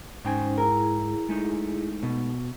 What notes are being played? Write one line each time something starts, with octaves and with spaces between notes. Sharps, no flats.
G#2 C#4 D#4 C5 G5 G#5
E4 G#4 A#4
G#3 A3 D#4
B2